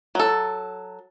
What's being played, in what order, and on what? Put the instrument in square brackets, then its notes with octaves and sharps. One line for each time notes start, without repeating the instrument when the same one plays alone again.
[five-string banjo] F#3 A4